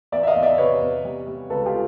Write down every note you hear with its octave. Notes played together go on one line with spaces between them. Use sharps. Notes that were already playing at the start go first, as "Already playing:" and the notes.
E2 D5 E5
E5
D#5 F5
E2
D5 E5
C3 B4 C#5
E2
G3
G3
C#2 A4 B4
F4 G4